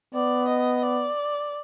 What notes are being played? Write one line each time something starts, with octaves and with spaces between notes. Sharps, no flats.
B3 D5
D#5
D5